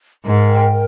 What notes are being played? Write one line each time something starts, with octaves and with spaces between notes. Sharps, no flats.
G#2 A#4
G5
A#4